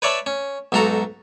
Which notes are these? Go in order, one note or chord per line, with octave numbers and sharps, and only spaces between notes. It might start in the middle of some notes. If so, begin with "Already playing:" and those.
B4 C#5 D5 E5 A5 B5
C#4
B1 G#2 F#4 A4 A#5